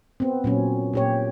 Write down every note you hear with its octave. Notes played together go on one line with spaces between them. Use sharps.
B3 C4
A#2 F#3 C#4
A#2 G4 C#5